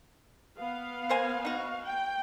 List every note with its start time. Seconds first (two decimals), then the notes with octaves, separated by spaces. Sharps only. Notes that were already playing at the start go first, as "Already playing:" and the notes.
0.56 B3 F5
1.09 A#3 C5 G#5
1.45 D#4 F#4
1.85 G5